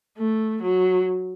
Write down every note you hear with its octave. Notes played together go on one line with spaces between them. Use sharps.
A3
F#3